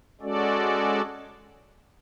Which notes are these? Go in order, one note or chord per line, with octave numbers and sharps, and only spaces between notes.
G#3 C#4 F#4 A4 D5